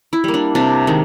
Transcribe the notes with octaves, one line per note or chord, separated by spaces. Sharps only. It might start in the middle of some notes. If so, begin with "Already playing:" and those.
E4
G3 A#3
D4
C3 D4
D#3 G#3